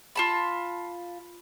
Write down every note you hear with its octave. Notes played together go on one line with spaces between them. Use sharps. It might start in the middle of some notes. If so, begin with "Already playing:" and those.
F4 A5 B5